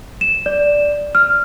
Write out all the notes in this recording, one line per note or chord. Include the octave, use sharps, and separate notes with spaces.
E7
D5
F6